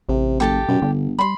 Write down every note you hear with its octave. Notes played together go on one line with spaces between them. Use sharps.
A1 C3
F#1 G4 A4 A5
F#2 B2
G1 D3
G3 B5 C6